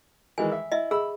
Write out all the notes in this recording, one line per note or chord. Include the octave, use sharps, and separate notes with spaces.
D#3 E3 G#3 G#5
E5
E4 D#5 E5
G#4 B5 E6